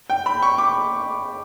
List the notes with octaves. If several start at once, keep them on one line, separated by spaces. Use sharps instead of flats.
G5
B5
C#6
D6